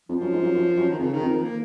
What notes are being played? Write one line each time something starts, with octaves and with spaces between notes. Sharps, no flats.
F2 F3
F#2
G#2
F#2
F#2
F#2
D#3
F2 C#3
D#3
F2
D#3
A#3